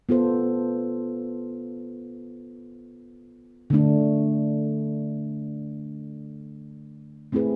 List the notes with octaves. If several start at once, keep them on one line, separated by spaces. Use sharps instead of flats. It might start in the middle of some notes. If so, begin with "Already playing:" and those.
B3 F4 A4 C5
D3 A3 D4
A3 C4 E4 G#4 B4